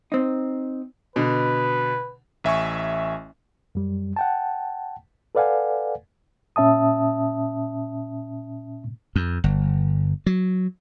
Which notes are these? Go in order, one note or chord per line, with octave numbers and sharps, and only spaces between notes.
C4 D#4
B2 D3 B4
A1 E5 G#5 C#6
F#2 G3
F#5 G5 A5
A4 B4 D5 F5 F#5 G#5
A#2 C#4 E5 A5 D#6
F2
G1
F#3